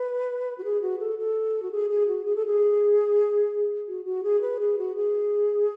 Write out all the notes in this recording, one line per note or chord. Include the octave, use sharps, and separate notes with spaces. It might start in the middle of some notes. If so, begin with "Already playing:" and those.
Already playing: B4
F#4
G#4
F#4
A4
A4
F#4
G#4
G#4
F#4
G#4
A4
G#4
F#4
F#4
G#4
B4
G#4
F#4
G#4